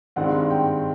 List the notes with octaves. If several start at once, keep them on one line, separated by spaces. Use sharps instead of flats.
G2 D#3 G#3 C4 F#5
G5